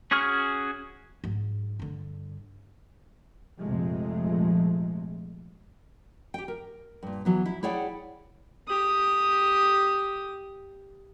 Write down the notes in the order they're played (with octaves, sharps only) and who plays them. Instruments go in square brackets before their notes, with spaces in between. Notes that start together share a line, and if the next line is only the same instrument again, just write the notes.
[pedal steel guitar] C#4 F#4 G#4 C#6 F6
[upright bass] G#2 F#3
G2 D3
[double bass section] A#1 F2 C3 F3 G#3 A3
[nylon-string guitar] G4 G5
A#4
G2 A#2
E3 F#3 B3
E4
E4 G#4 C#5 D5 F#5 G5
[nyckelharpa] G4 D#6